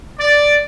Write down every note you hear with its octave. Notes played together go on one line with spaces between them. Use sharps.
D5